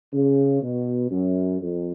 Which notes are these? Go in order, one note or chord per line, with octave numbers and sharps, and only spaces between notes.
C#3
B2
F#2
F2